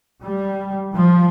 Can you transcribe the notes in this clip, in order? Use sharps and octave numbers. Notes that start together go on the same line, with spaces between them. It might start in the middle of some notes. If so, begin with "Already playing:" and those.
G3
F3